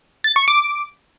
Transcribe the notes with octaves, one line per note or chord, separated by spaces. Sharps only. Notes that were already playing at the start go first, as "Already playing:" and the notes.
A6
C#6
D6